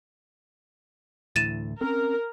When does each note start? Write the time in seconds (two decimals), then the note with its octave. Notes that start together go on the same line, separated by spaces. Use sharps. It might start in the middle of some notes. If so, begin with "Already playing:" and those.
1.36 D2 A2 E3 A6 D#7 E7
1.81 C4 C#4 A#4